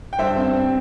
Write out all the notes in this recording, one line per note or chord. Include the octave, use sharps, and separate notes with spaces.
G5
G2 C5 E5
C4
C4